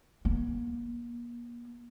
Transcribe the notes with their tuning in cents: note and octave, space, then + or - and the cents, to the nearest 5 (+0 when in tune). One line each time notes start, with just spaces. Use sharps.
A#3 +35